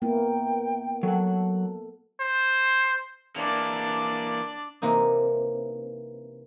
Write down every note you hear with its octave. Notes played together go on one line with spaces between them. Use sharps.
A#3 B3 E4 G5
F#3 A4 F#5
C5
E3 A#3 D4 D5
C3 E3 A#3 D#4